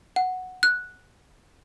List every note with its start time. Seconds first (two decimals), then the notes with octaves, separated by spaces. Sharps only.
0.16 F#5
0.63 F#6